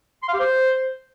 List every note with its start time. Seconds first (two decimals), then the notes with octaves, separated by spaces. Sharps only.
0.23 C6
0.28 F5
0.34 G4
0.39 C5